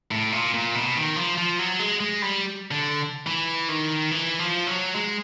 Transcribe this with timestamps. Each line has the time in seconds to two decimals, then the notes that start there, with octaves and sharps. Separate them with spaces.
0.11 A2
0.32 A#2
0.54 A#2
0.75 B2
0.96 D#3
1.16 F3
1.38 F3
1.59 F#3
1.79 G#3
2.00 G#3
2.22 G3
2.71 D3
3.27 E3
3.69 D#3
4.11 E3
4.39 F3
4.67 F#3
4.95 G#3